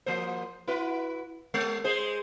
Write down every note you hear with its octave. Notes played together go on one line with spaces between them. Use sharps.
F3 A#3 C5
E4 F#4 B4
G#3
G#3 G#4 C5